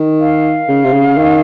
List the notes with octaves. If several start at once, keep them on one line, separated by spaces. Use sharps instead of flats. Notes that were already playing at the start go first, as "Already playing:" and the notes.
Already playing: D#3
F5
C#3
C3
C#3
D#3